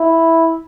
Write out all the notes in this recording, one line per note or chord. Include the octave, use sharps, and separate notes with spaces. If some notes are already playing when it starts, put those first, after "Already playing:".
Already playing: E4